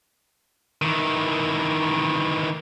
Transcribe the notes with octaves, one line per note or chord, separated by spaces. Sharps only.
D#3 E3